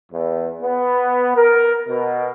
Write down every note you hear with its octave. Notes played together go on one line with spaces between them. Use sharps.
E2
B3
A#4
B2